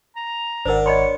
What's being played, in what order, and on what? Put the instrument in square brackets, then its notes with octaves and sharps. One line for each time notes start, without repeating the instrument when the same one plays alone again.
[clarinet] A#5
[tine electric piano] G#1 F#5 [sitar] D4 [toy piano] A#4 C5
[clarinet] C#5 [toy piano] D#5 B5 C6